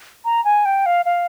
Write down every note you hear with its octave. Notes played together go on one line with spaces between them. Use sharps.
A#5
G#5
G5
F5
F5